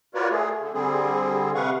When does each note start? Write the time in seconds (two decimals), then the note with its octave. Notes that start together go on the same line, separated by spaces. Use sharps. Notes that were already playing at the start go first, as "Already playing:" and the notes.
0.15 F4 F#4 A#4 B4 C#5 D5
0.31 A3 G#4
0.61 D3
0.74 D3 G3 C4 G#4
1.55 C3 B4 F5 F#5 C#6